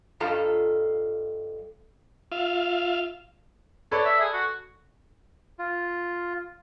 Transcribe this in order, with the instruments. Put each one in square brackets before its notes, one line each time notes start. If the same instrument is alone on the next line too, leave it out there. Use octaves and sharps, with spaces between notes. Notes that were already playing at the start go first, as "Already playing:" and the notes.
[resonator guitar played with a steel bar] G2 F3 F4 A4 D#5 A#5
[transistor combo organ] F4 E5 F5
[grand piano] A4 B4 D5 [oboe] C#5
[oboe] E5
G#4
F#4
[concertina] F4